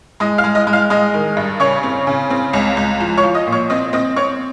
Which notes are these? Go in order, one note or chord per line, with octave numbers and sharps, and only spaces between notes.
G#3 D#5 D#6
F5 F6
G#3
D#5 D#6
G#3
F5 F6
G#3 D#5 D#6
D#3
G2
C#3 C#5 C#6
C4
C#3
C4
C#2
C#2
F3
C#5 C#6
F3
D#5 D#6
A#2
C#5 C#6
C4 D#5 D#6
C4 D#5 D#6
C4 C#5 C#6